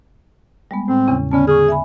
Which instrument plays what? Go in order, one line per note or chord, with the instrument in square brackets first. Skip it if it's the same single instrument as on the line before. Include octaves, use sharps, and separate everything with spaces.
[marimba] G3 G#3 B3
[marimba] A2 [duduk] C4
[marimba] E2 C#3 C#4
[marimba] D3 B3 A5 [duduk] C#4
[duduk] G#4 [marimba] C#6 F6
[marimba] E5 G#5 B5